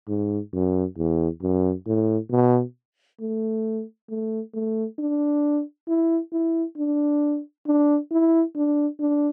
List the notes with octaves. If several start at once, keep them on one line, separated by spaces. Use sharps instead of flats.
G#2
F#2
E2
F#2
A2
B2
A3
A3
A3
D4
E4
E4
D4
D4
E4
D4
D4